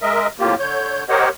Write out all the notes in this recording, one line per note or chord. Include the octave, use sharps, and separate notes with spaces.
G#3 A#4 D#5 E5
F2 A2 A#3 F4 G4
D3 C#5 G6
G4 A#4 C5 C#5 D#5 F#5